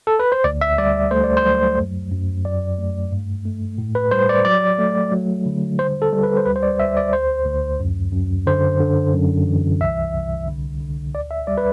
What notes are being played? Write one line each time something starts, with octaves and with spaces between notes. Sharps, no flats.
A4
B4
C5
D2 D5
E5
G3 D5
A3 C5
D5
C5
F#3
F#2
F#2
F#3 D5
A3
G2
A3
A2
B4
G3 C5
D5
F#3 D5
A3
F#3
D3
G3 C5
A4
G3
B4
C5
D2 B4
C5
D5
D2 E5
D5
D2 C5
D2
F#2
F#2
D3 C5
D3
F#2
E3
C2 E5
C2
D3
D3
D2 D5
E5
G3 D5
B4